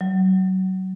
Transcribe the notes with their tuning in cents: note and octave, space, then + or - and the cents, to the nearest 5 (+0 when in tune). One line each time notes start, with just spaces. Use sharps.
F#3 +25